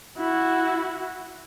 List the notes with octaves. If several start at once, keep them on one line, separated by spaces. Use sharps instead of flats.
E4 F#4